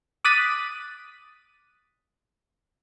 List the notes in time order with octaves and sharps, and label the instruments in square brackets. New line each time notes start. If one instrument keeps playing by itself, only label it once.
[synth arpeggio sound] D6 D#6 F#6 A6 B6 D#7